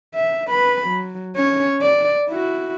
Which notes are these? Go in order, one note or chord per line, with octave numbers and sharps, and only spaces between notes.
E5
B4 B5
F#3
C#4 C#5
D5
E4 F#4